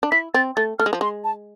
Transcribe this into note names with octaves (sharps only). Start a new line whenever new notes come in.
D4
E4 B6
C4 A6
A3 A6
A3 F6
G#3
F3
G#3 C6
A5